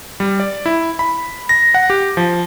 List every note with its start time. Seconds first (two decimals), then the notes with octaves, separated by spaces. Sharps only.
0.20 G3
0.40 D5
0.66 E4
0.99 B5
1.49 A#6
1.74 F#5
1.90 G4
2.17 F3